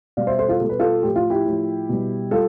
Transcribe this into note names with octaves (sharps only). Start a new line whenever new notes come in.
B2 G3 D5 F5
C5 E5
A4 C5
F4 A4
B2 G3 A4
B4
F4 A4
A2 F3 G4
F4
E4 G4
A2 F3
B2 G3
G3 F4 A4